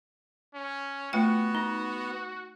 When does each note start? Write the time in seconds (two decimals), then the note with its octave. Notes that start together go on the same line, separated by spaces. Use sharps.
0.54 C#4
1.13 A3 B3 F4 F#4 G5
1.55 D#4